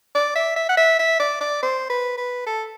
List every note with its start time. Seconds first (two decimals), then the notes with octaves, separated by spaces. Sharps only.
0.15 D5
0.36 E5
0.56 E5
0.69 F#5
0.77 E5
0.99 E5
1.20 D5
1.41 D5
1.63 C5
1.90 B4
2.18 B4
2.47 A4